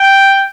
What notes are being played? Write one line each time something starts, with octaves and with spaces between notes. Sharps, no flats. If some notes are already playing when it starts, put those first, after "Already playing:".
Already playing: G5